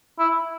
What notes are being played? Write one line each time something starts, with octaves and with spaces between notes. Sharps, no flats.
E4